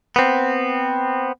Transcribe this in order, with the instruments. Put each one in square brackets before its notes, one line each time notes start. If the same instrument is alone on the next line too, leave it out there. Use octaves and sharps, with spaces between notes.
[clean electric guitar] B3 C4